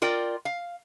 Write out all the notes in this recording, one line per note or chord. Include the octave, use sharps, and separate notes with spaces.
F4 A#4 D5 G5
F5